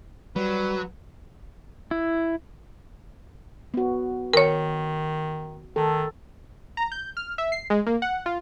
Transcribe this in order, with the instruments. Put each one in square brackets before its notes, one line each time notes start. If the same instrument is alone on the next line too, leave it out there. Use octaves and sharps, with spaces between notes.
[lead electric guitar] F#3 [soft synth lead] G3 [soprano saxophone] B4
[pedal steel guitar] E4
[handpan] B3 F#4
[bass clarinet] D#3 [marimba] A#4 C#5
[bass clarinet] D#3 [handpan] A4
[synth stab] A#5
G6
F6
E5
C7
G#3
A#3
F#5
F4